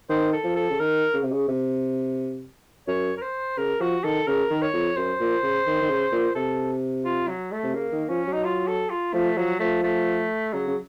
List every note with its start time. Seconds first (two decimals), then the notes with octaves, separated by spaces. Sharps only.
0.09 D#3 C5
0.33 A4
0.44 F3
0.56 A4
0.70 C#3
0.79 D#3 A#4
1.14 C#3
1.23 C3
1.32 C#3
1.48 C3
2.88 F#2 C#5
3.17 A#4
3.22 C5
3.57 C#3 A#4
3.80 F3 F#4
4.04 D#3 A4
4.27 C#3 A#4
4.50 D#3
4.62 C#5
4.73 F2
4.97 F#2 C5
5.20 A#2
5.43 C#3
5.67 D#3
5.82 D#3
5.89 C#3
6.12 A#2
6.35 C3 A4
7.05 F4
7.28 F#3
7.52 A3
7.63 C3
7.74 C#3 A#3
7.92 D#3
8.09 F3 C#4
8.27 F#3
8.33 D#4
8.44 F4
8.67 A4
8.90 F4
9.13 F3 A3
9.37 F3 F#3
9.60 F3 A3
9.83 A3
10.53 C#3 F#3
10.67 C#3